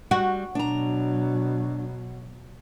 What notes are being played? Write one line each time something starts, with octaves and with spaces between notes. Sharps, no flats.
G3 F#4
B2 F#3 D4 A#5